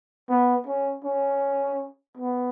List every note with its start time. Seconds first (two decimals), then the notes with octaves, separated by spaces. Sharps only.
0.29 B3
0.67 C#4
1.05 C#4
2.17 B3